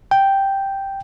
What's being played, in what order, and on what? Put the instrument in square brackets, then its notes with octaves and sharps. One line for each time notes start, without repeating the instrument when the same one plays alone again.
[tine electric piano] G5